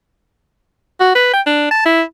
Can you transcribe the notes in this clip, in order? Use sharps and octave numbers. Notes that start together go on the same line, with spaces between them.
F#4
B4
G5
D4
A5
E4